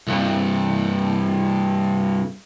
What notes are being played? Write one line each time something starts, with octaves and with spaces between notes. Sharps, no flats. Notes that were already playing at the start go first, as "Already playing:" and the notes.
C2 G2